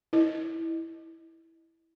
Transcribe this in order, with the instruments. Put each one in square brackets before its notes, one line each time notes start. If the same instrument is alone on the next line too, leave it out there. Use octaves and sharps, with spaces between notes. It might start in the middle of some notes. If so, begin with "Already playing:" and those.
[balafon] E4 D#5